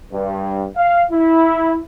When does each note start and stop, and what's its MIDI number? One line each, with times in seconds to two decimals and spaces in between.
0.13 0.65 43
0.77 1.04 77
1.11 1.78 64